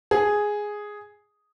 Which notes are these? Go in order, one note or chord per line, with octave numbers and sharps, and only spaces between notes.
G#4